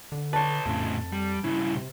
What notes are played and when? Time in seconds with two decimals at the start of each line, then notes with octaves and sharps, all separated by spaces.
0.12 D3
0.33 B4 C#5 A5
0.66 F2 A2 C#3
1.12 G3
1.44 G2 C#3 E4
1.75 C3